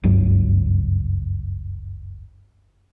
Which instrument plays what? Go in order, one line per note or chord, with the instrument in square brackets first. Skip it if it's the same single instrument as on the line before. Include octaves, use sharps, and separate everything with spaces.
[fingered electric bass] F#1 C#2 G2 F#3